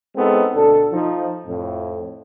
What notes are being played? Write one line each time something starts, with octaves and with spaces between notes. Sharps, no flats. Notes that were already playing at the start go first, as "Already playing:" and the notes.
G#3 B3 C4 D#4 E4 A4
D2 B2 D4 A4
F3 D#4
F2 A2